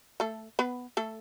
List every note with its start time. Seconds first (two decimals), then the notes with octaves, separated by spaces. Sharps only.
0.20 A3 A4
0.59 B3 B4
0.97 A3 A4